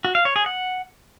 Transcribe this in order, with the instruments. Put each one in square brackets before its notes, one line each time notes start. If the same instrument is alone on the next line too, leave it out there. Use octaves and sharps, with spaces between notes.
[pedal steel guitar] F#4
F5
C#5
G#4
F#5